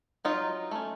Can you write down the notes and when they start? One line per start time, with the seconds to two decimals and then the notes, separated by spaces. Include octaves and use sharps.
0.25 F#3 D#4 F4
0.71 A3 C#4